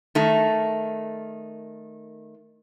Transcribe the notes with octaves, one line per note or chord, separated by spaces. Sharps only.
D#3 A3